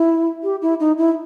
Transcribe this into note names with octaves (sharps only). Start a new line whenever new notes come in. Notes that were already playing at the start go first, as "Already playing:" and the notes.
Already playing: E4
G4
E4
D#4
E4